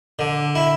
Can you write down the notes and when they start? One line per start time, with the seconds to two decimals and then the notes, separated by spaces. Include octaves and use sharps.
0.19 D3
0.55 E4